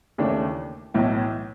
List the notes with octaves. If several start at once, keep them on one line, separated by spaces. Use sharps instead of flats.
D#2 C#3 E3 A3 D4
B1 A2 E3